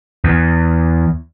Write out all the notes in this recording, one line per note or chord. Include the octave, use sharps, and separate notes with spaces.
E2